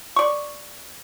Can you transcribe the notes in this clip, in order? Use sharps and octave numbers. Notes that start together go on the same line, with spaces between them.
D5 C#6